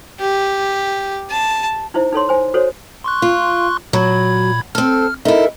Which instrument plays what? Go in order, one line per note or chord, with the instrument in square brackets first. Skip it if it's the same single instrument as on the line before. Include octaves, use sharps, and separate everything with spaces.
[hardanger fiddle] G4
A5
[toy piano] D#4 E4 C5 E5
D#4 A4 C#5 C6
C5 G#5
F#4 A4 C5 C#5
[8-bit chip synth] C6 C#6 F#6
[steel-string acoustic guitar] F4
[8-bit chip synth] A#2 B5 G#6 [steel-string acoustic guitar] F#3
[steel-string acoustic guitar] C4 A4 [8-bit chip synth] F6
[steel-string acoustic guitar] D#4 E4 [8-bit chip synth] A4 A#4 E5